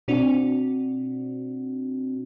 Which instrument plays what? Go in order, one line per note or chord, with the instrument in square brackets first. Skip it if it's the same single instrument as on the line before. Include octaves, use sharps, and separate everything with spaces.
[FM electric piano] B2 C4 D4 F#4